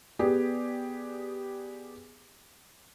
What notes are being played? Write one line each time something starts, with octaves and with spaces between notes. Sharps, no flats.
B3 G4 G#4 D5